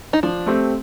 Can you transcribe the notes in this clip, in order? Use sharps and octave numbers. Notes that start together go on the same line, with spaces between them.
D#4
F3 D4
A3 C4 G4